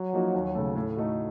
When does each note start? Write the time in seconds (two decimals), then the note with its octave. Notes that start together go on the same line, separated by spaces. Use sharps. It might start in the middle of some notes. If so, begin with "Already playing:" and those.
Already playing: F#3
0.13 F3 A#3 D#4 F#4
0.34 D#2
0.55 C#3 A3
0.75 A2
0.97 A3 D#4 F#4